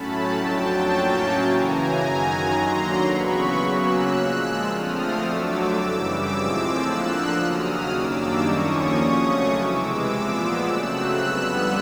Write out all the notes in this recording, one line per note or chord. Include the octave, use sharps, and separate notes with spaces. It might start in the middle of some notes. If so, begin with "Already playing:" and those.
Already playing: A2 F#3 A3 C#4 A5 B5
F2 D3 F#3 G5 A5
A2 F#3 A#3 C#4
F#2 C#3 E3 G#5 A#5
F#2 D#3 F#3 G#5 A#5
D#2 D3 F#3 A#3 A#5 C6
E2 C#3 F#3 B3 B5 C#6
C#3 F#3 A#3 C#4 E6 F#6
A#2 F3 G#3 E6 F#6
D3 F3 A3 C4 D#6 F6
F2 D3 F#3 A3 D6 E6
F#2 C#3 E3 G3
A2 F3 G#3 C4 D6 E6
D3 F3 A#3 E6 F#6
D#2 C#3 F#3 D#6 F6
F#2 D#3 G3 A#3 D4 D6 E6
D#2 D3 F3 A#3 C#4 C#6 D#6
F2 C#3 F#3 A3 C#4 C#6 D#6
C3 E3 G#3 D6 E6
A#2 F3 G#3 B3 D6 E6
C#3 F#3 A3 C4 E6 F#6
F2 D3 G3 B3 E6 F#6